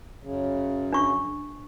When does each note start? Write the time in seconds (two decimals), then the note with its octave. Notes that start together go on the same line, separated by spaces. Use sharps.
0.24 F#2 C#3
0.93 D4 C#6